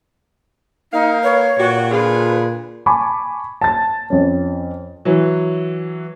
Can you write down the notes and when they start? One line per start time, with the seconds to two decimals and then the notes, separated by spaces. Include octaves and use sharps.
0.92 A#3 D#4 F5
1.23 B4 C#5
1.58 A#2 F#4 G4
1.91 D3 F4 G#4 B4
2.86 G#5 A5 B5 C#6 D6
3.61 A5 A6
4.10 F2 C#4
5.05 E3 F#3